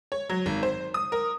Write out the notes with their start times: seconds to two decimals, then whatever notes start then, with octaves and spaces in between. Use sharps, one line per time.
0.12 C#5
0.30 F#3
0.46 G#1
0.63 C5
0.94 D#6
1.12 A#4